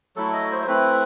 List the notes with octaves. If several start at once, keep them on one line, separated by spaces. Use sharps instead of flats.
F#3 A3 E4 A4
D#5
C5
C5
A3 C4 E4 B4